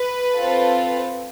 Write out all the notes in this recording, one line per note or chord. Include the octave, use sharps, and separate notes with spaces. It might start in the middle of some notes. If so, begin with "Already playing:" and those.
Already playing: B4
C4 F4 A4